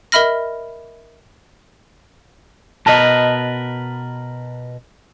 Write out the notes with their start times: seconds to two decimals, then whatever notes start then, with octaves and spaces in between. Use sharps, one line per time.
0.12 A#4 D#5 E5 B5 F6 A#6
2.86 B2 A#4 B4 D#5 A5